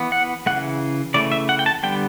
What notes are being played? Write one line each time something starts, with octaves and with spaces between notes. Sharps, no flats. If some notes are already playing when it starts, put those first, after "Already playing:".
Already playing: E3 B3
F#5
C#3 E3 A3 F#5
C#3 E3 A3 D5
E5
F#5
G5
A5
D3 G3 B3 G5